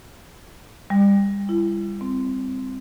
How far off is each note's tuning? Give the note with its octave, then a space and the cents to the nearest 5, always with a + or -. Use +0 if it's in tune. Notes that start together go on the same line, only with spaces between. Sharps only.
G3 +30
E4 +40
C4 -10